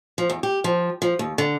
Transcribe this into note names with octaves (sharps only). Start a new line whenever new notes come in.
F3
E2
G4
F3
F3
D#2
D3